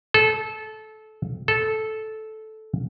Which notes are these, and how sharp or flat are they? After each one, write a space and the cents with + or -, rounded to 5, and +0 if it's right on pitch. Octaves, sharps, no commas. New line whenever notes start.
A4 -20
A4 -10